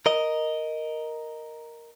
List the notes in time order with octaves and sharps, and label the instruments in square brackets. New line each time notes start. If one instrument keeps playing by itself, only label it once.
[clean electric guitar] A#4 D#5